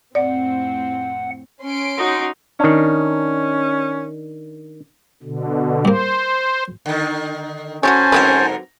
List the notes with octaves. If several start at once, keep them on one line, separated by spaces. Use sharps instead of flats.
F2 A2 C4 D5 F#5
C#4 C6 D7
D#4 F#4
D#3 C#4 D4
B2 D3
G2 A#3 C5
D3 D#3
A2 C#4 F#4 G4 C5 C#5 G#5 A5
G#2 D3 F#3 C4 A#4 B4